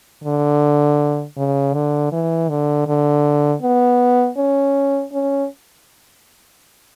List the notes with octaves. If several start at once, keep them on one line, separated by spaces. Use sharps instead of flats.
D3
C#3
D3
E3
D3
D3
B3
C#4
C#4